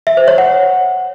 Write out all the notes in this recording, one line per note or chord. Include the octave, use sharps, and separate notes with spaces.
E5
C5
C#5
F#5